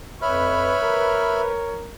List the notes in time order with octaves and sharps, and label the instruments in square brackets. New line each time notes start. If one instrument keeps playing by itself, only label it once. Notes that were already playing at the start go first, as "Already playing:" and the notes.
[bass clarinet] F2 [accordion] B4 [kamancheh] C#5 [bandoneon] E5 B5 F6
[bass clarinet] A#4